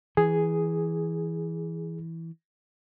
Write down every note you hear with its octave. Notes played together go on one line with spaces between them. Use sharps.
E3 G#4